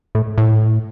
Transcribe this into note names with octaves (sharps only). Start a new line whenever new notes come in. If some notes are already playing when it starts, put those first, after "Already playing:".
A2
A2